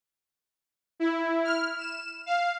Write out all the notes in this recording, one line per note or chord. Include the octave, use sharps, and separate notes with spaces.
E4
F6
E7
F5